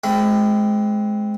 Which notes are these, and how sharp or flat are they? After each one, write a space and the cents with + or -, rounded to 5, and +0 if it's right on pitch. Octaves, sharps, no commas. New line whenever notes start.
G#3 +25 C4 +0 B5 +30